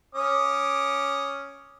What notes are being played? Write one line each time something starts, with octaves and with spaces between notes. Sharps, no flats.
C#4 D6 D#6